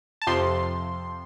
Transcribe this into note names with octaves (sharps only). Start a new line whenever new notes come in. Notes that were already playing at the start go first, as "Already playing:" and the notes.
A5
F2 C3 F3 C6